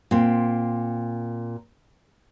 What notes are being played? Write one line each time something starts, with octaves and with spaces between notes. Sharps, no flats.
A#2 C4